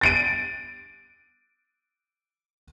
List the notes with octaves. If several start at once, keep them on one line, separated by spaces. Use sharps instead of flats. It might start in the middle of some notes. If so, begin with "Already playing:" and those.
A6 D7 D#7